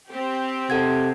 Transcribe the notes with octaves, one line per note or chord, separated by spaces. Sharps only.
C4 G4
C3 A4 F#5 G#6